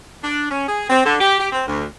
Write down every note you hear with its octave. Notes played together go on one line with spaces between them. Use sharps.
D4
C#4
G#4
C4
D3
G4
G4
C4
D2